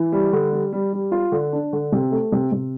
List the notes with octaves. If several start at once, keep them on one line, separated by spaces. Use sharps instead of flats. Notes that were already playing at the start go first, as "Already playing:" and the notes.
Already playing: E3
G3
D3
G3
G3
G3
F4
D3
D4
D3
C3
A3
C3
C3